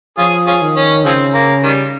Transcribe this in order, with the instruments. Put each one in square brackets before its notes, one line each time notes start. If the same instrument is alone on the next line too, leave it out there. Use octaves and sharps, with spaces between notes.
[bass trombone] F3 [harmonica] C#4 F4 G#4
[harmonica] C#4 F4 G#4
[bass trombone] D#3
[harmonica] C#4
[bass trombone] C#3 [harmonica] F3 G#3 C4
[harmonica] A#3
D#3 G3